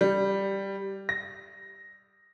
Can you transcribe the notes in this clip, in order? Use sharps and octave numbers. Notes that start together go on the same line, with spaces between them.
G3
A#6